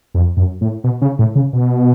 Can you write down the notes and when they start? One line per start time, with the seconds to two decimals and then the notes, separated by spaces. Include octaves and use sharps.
0.14 F2
0.37 F#2
0.61 A2
0.84 B2
1.02 C#3
1.19 A2
1.35 C#3
1.53 B2